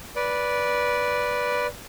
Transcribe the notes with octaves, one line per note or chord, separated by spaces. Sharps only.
B4 D5